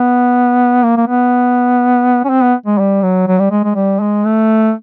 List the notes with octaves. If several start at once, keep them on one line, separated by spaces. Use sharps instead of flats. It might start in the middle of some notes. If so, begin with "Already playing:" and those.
Already playing: B3
A#3
A#3
B3
C#4
C4
B3
G#3
G3
F#3
F#3
G3
G#3
G#3
G3
G#3
A3